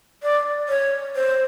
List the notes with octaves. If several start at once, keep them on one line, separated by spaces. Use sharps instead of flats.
D5
C#5
C5